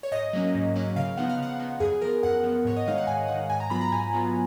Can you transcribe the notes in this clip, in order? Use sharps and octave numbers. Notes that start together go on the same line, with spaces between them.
C#5
G#2 D#5
F#3 A#3 C#4
G#2
F#3 A#3 C#4
C#3 F5
F3 B3 D#4 F#5
F5
C#3 F#5
F3 B3 D#4
F#2 G#4
F3 B3 A#4
F#2 F#5
F3 B3
G#2 C#5
D#5
D#3 G#3 D#4 F5
F#5
G#2 G#5
D#3 G#3 D#4 F#5
G#2 G#5
A#5
F#3 B3 F4 B5
A#5
G#2 G#5
F#3 B3 F4